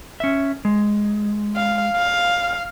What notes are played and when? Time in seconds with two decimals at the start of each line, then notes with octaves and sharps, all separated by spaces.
0.20 C#4 E5
0.65 G#3
1.56 F5
1.96 F5